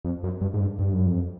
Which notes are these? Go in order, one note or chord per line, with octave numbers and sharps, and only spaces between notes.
F2
F#2
G2
G#2
G2
G2
F#2
F2